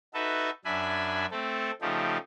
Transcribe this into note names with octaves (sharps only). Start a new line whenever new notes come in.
D#4 F#4 A4 B4 E5
F#2 D4 E5 G#5 B5
A3 C4 A4
C#3 F3 A3 D#4 G4